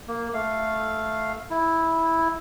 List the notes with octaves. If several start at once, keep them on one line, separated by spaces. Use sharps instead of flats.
A#3
A3 F5
E4